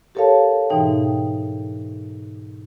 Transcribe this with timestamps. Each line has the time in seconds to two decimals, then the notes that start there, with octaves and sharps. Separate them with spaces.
0.15 G4 A4 A#4 C#5 F5 A5
0.70 G#2 B2 E3 D#4 G5